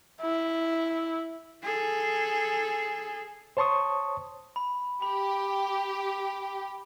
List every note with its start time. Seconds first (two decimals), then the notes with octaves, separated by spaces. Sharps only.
0.22 E4
1.63 G#4 A4
3.57 C5 C#5 A5 C6 C#6 D#6
4.56 B5
5.02 G4 B5